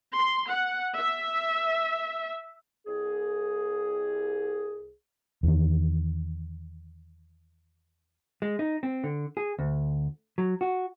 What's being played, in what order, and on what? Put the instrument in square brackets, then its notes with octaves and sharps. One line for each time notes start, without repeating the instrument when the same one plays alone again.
[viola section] C6
F#5
E5
[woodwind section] C2 G#4
[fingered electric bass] E2 D#3
[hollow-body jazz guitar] G#3
D#4
C4
D3
G#4
D2
F#3
F#4